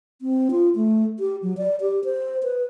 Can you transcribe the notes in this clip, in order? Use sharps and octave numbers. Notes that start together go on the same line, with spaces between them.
C4
F4
A3
G4
F#3
D5
G4
C5
B4